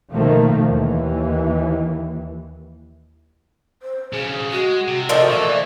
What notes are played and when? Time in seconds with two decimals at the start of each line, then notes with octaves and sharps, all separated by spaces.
0.12 B2 D#3 F3 A3 A#3
0.68 D#2 E3
3.82 C5
4.12 B1 C#3 G#4
4.52 G#3 F#4
4.88 C3
5.09 A#2 F3 A3 D#5
5.30 E3 D5